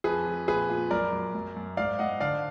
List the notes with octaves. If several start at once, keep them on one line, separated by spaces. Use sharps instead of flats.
F2 G#4 B4
F2
A#2 G#4 B4
A#2
F#2 A#4 D5
F#2
F#2
F#2
G#2 D5 F5
G#2 D#5 F#5
D3 D5 F5